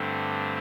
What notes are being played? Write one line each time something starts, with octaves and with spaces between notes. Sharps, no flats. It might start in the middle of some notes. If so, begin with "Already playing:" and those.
Already playing: G2 D3 A3 C4